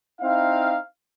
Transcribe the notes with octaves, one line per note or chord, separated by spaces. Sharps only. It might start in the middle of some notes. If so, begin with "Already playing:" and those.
C4 D#4 E4 F5